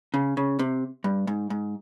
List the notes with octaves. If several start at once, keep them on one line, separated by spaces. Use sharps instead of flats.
C#3
C#3
C3
G2
G#2
G#2